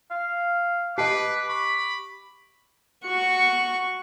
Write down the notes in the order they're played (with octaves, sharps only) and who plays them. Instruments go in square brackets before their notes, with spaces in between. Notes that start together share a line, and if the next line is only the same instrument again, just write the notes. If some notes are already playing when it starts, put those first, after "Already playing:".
[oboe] F5
[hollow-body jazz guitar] G4 D#5 [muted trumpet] B4 [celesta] A5 C7 [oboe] D6
[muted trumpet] B5 [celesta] C#6
[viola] F#4 C#6